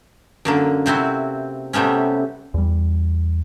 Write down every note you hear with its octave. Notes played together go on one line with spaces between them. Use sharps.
F#2 D3 A#3
C3 C4 E4 F#4
C3 G3 A3 B3 C#4
E2 G3